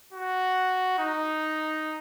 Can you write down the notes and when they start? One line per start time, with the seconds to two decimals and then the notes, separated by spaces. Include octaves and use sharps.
0.13 F#4
0.99 D#4